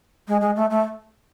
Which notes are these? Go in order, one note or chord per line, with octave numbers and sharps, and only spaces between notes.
G#3
G#3
A3
A3